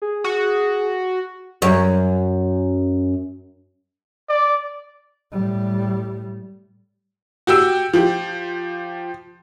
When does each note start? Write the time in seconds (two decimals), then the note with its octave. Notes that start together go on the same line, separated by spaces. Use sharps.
0.02 G#4
0.24 F#4
1.62 F#2 C#5
4.29 D5
5.32 A2 G3
7.47 F#4 G4 G5 E6
7.93 F3 G4